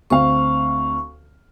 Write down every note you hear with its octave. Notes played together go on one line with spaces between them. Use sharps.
D2 C4 F5 C#6